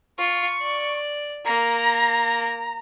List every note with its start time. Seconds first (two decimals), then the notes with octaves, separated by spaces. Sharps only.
0.18 F4 C#6
0.62 D5
1.45 A#3 A#5